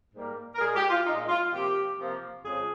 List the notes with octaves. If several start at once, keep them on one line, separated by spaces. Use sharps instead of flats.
G#2 G3 A#3
A#4
A#2 G#3 G#4
G4
F4
A#2 G#3 D#4
F4
C3 F3 A#3 G4
C3 F3 A#3
F2 C#3 F3 G#3 G#4